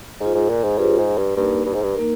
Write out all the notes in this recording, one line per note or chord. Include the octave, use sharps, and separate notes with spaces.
G#2 F4 G#4 C5
G#2
A#2
G#2
G2 F4 G#4 C5
G#2
G2
G2 A#3 D#4 A#4
G2
G#2
G2
A#3 D#4 A#4